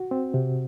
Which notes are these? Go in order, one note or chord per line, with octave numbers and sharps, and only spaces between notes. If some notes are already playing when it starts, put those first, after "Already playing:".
Already playing: F#4
C4
C3